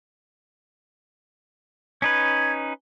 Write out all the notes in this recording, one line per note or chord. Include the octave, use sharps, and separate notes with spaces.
C#4 D#4 B4 G#6